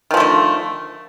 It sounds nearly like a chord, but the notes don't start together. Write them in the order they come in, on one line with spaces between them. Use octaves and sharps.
D#3 F3 A3 D3